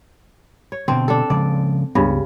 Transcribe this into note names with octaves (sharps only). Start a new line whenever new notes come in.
C#5
B2 D3 C4
D4 A4
C#3 F3 G#3 D5
C#2 G2 C#3 B3